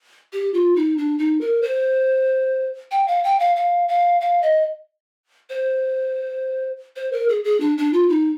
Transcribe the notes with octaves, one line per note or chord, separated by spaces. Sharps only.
G4
F4
D#4
D4
D#4
A#4
C5
G5
F5
G5
F5
F5
F5
F5
D#5
C5
C5
A#4
G#4
G#4
D4
D4
F4
D#4